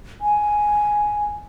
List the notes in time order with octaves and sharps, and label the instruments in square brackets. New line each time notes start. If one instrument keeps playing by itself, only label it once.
[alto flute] G#5